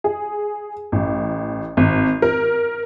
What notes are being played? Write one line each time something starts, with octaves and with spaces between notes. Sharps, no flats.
G#4
A1
G#1
A#4